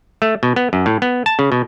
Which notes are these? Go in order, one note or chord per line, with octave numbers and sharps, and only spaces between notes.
A3
B2
B3
F#2
A2
B3
A5
C#3
B2